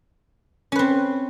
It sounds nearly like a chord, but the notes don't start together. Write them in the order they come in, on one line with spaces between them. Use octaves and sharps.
C#4 B4 C4